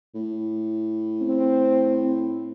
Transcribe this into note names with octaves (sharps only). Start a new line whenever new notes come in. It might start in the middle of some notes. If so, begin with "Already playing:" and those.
A2
C4